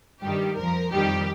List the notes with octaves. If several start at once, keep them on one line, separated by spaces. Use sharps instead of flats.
G2 D#3 G3 G4
F2 F3 A#4
F2 D#3 G3 G4